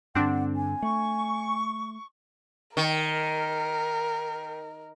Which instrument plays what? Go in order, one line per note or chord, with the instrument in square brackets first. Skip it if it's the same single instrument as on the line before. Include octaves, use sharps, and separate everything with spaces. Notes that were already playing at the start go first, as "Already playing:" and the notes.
[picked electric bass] G2 D3 [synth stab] C4 D4 [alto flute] F#5
[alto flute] G#5
[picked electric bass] A3 [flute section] C#6
[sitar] D#3 [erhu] A#4